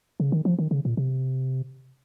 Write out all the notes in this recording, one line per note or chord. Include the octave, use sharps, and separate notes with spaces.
C#3
D#3
F3
D#3
C#3
A#2
C3